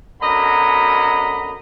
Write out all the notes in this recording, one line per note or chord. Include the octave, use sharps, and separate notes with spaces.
F#2 B2 D3 D#5 A#5 B5